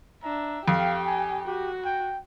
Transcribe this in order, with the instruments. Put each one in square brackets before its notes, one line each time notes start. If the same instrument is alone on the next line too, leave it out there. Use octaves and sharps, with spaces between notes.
[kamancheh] D4 E5 [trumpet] A#5
[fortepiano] F2 [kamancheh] G4 G5 [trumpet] F5
[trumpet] G#5
[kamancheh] F#4 [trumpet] G4
[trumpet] G5